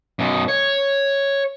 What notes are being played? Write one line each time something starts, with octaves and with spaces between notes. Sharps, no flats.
F#2 B2
C#5